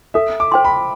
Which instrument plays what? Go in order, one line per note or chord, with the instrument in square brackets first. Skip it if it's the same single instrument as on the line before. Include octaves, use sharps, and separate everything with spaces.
[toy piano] A4 [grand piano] E5
[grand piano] D6
[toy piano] C5 G5 C6
[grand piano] B5